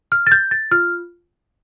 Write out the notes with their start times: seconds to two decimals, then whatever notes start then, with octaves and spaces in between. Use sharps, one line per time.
0.12 F6
0.27 A6
0.32 G6
0.51 A6
0.71 F4 F6